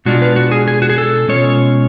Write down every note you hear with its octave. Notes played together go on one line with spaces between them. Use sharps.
B2 G#3 D4 F4 F#4
B4
F#4
G#4
G#4
F#4
G#4
A4
B2 G#3 C#4 F4 C#5